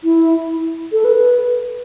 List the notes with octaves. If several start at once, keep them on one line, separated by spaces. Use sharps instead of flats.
E4
A4
B4